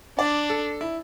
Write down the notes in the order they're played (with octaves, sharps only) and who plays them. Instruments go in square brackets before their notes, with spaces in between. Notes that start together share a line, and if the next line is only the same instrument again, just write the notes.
[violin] D4 [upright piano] D5
[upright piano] A4
E4